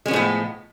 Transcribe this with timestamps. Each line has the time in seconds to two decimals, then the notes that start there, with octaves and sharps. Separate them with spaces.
0.06 G#3
0.08 C#4
0.11 F3
0.13 A2
0.16 B3